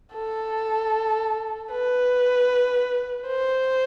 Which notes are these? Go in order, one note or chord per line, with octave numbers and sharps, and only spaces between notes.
A4
B4
C5